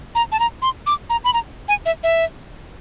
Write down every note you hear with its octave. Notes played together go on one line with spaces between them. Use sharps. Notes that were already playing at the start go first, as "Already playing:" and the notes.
A#5
A5
A#5
C6
D6
A#5
B5
A#5
G#5
E5
E5